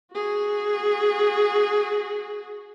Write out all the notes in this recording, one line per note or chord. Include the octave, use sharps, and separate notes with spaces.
F#4 G#4